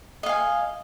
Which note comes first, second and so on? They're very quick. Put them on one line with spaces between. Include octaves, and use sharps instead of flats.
D#5 F5 G#5